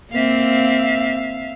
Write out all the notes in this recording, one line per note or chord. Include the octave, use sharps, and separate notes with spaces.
A#3 C4 E5 F5